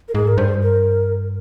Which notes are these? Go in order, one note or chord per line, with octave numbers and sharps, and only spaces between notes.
A#4
G#2 G#4
A#4
G2 C5
A#4